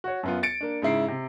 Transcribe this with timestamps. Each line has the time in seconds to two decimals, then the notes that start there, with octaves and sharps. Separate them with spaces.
0.04 F#4 C#5
0.23 F#2 B3 F4
0.43 A6 C#7 D7
0.61 A#3 D4
0.82 G#2 C#3 E4 C7
1.08 C3